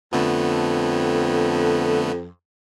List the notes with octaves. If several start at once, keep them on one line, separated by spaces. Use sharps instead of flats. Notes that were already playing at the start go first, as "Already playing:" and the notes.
F2 D3 A3 B3